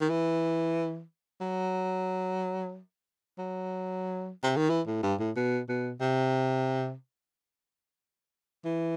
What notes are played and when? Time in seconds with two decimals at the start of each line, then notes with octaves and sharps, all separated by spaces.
0.01 D#3
0.10 E3
1.41 F#3
3.38 F#3
4.44 C3
4.57 D#3
4.70 E3
4.87 A2
5.03 G2
5.20 A2
5.36 B2
5.69 B2
6.01 C3
8.65 E3